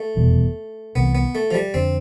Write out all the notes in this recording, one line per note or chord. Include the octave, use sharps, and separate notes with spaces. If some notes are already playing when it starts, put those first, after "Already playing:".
Already playing: A3
F1 E2 B2 G3
C2 C3 E3 B3
B3
A3
F3
G3
F2 D3 F3 C4